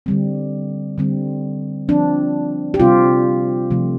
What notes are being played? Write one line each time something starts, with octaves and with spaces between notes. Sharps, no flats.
D3 G3 C4
D3 G3 C4
F3 C4 D4
G4
C3 G3 C4 F4
C3 F3 A3